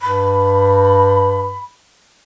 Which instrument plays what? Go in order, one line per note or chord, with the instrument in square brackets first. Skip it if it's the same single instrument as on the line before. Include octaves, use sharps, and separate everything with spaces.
[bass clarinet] G2 [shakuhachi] B5